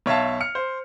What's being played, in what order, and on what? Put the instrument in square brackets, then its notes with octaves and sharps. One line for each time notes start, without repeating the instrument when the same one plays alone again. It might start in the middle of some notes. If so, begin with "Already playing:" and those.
[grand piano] B1 C#5 E5 F5 A5
F6 C#7
C5